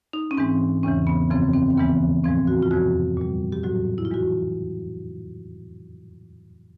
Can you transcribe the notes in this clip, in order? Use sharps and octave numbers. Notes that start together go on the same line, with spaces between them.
D#4
C#4
G#2 E3 G#3 C4
E2 C#3 E3 C#4
B3
F#2 C#3 F3 C4
C4
C4
D#2 C#3 E3 G#3 B3
A2 F3 G#3 C4
F#4
F4
F2 C3 F3 G#3 F#4
A#2 G3
G4
A2 F#3 F#4
E4
F4
E3 G#3 F#4